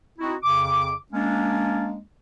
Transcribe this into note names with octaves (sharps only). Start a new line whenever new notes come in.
C4 D#4 E4 F#4
F2 C#3 D6
G#3 A#3 C#4 D4